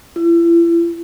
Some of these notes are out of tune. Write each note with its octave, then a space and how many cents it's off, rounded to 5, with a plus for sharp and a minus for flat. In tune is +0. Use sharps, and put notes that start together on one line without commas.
E4 +40